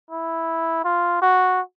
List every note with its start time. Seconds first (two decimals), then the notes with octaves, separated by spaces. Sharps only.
0.10 E4
0.84 F4
1.22 F#4